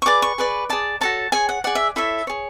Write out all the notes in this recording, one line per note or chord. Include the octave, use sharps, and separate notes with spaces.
C#6
G#4 B4 D5 D6
C#6
G#4 B4 D5
G#4 D5 A5
F#4 A4 C#5 A5
G#4 C#5 G#5
F#5
G#4 D5 F#5
E5
E4 A4 C#5 E5
G#4 C#5